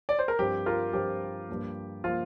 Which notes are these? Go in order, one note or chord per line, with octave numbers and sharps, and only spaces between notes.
D5
C5
A#4
G2 F3 C4 G4
F4 A#4
G2 F3 C4 G4
G2 F3 A#3
F3 A#3 F4